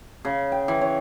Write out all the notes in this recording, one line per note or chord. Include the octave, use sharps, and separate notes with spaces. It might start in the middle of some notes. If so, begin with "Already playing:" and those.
C#3
G5
E3
C#5